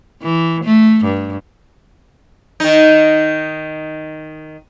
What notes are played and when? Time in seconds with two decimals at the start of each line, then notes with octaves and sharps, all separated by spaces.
0.22 E3
0.64 A3
1.05 G2
2.60 D#3 D#4